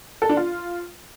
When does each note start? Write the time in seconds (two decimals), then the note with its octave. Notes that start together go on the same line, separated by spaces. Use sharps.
0.22 A4
0.29 D4
0.37 F4